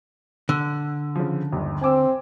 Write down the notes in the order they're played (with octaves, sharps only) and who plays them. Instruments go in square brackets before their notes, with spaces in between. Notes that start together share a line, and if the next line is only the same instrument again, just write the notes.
[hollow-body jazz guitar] D3 [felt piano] E6
[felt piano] C#3 F3
G1 D#2
[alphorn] C4 [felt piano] G#5 D6 E6